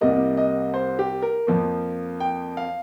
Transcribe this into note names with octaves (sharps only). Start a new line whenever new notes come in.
C2 C3 G3 A#3 D#5
D#5
C5
G4
A#4
F2 F3 A#3
G5
F5